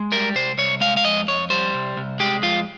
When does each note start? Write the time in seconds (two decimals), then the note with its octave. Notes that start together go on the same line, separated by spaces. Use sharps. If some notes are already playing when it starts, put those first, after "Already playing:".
Already playing: G#3
0.12 G3 A#4
0.35 C2 C5
0.58 C2 C#5
0.81 G#3 F5
0.97 F5
1.04 F2 D#5
1.28 F2 C#5
1.50 G3 C5
1.74 C2
1.97 C2
2.20 G#3 G4
2.43 F2 F4